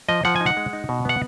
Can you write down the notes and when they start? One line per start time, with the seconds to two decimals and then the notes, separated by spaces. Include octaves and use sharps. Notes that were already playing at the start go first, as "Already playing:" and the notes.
0.08 F3 D#5
0.25 F3 F#5
0.36 G#5
0.41 D#4
0.46 F#5
0.57 G#3
0.73 D#4
0.89 B2
1.05 B3 F#5